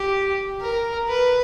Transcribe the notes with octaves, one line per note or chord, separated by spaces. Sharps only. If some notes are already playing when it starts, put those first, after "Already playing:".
Already playing: G4
A#4
B4